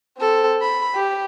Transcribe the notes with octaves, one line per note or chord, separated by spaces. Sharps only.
C4 A4
B5
G4